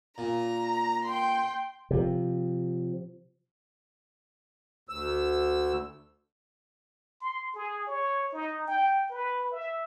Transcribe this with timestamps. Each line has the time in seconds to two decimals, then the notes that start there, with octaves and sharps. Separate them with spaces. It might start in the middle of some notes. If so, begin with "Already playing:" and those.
0.18 A#2 A#5
1.05 G5 C6
1.91 C3 F3
4.89 D2 E6
7.21 C6
7.55 G#4
7.87 C#5
8.33 D#4
8.67 G5
9.10 B4
9.51 E5